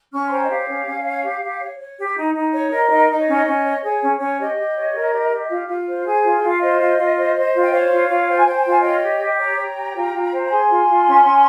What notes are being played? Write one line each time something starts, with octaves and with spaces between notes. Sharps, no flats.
C#4 C#6 F6
C6
C5 G5 A#5
D#5
G4 C#5 F5
C#4
C#4
C#5
G4
G4
C#5
C#5
G4
D#4
D#4
C#5
A#4 D#5
C#5
D#4 D#5
D#4 D#5
C#5
C#4 D#5
C#4
C#5
G#4 C#5
C#4
C#4 C#5
G4 D#5
G4
C#5
A#4
G4
G4
F4
F4
C5
G#4
F4
G5
F4
F5
C5 D#5
F4
F4
C5
C5
F4
G5
C5 C#5 F5
F4
F4
C5 G5
G#5
C5 G5
G#5
F4 G5
G#5
C#5 D#5 G5
G4
G4
C#5 G5 A#5
C#5
G4
F4
F4
C5
G#4 G#5 C6
F4
F4
C#4
C#4